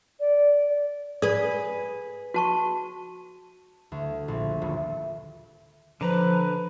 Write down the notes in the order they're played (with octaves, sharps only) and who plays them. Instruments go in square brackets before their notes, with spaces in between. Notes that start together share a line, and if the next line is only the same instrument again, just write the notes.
[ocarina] D5
[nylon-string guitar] G#4 B4 [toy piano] D5 D#6
[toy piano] F#4 A5 C#6
[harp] D2
A#1
D#1
[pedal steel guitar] D3 A#5 B5 [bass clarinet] F3 [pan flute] B4